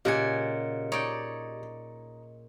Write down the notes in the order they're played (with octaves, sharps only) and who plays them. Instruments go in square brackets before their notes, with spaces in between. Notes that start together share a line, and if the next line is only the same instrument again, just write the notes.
[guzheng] A#2 C#3 [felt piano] G4 [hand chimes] D#5 C#7 [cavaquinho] F#5 G#5
[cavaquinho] D#4 [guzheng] C#5 D5 G5